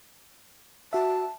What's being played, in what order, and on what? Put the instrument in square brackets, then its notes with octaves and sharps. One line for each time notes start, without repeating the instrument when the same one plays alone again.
[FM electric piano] F#4 E5 [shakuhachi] A5